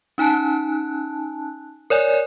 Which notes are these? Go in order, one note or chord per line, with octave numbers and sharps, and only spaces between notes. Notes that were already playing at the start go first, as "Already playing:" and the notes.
C#4 D#4 G#5 A5 F#6
A#4 C#5 D5 G#5